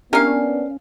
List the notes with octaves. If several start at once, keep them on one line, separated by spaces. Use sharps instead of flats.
A#3 B3 C#4 D4 E4 G4 A#4 F5